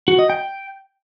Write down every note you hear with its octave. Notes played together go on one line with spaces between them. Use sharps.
F#4
D#5
G5